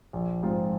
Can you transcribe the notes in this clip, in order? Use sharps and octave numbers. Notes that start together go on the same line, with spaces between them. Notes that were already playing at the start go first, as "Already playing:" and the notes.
A#1
G#2 F3 C4 F4